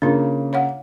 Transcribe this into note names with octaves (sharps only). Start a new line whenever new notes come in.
C#3 A#3 D4 F4
C#5 F5 F#5